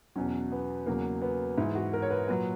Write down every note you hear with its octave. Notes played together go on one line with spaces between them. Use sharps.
E2 B2 F#3 C#4
B3
E2 C#3 F#3 A#3
B3
G#2 E3 E4
F#4
A#4
C#5
B4
A#2 F#3 B4